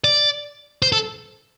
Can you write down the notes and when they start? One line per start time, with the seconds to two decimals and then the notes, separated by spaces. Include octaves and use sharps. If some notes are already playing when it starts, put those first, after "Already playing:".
0.04 D5
0.82 C5
0.92 A4